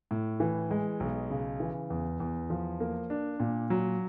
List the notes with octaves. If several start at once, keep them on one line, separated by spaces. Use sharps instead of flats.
A2
E3
G#3
B1
C#3
E3
E2
E2
F3
A#3
D4
A#2
F#3